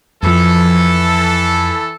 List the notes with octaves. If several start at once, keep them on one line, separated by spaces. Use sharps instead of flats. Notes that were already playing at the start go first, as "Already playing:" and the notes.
F2 E3 F3 A4